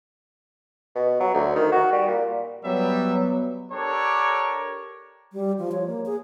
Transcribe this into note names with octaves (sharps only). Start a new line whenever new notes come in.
B2
F#3
D2
D#3
F#4
G3
A#2
F#3 G3 B3 E5
D4 G4 A4 A#4 C#5
G3
F3
C#5
A#3
G#4